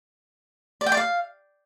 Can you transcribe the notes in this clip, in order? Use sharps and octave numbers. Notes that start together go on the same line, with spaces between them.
D5
G5
D5
F5